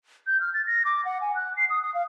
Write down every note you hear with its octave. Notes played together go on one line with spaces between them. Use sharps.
G6
F6
A6
A#6
D6
F#5
G#5
F#6
C7
D#6
D#6
F5